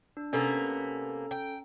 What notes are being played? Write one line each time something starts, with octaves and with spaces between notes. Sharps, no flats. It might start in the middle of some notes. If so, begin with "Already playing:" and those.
D4
C3 A#3 B3 C#4 A4 A#5
G5